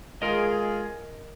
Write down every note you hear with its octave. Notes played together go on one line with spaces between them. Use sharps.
G#3 F4 G#4 A#4 D#5